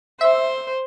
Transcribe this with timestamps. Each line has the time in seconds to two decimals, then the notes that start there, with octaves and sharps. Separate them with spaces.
0.21 C5 E5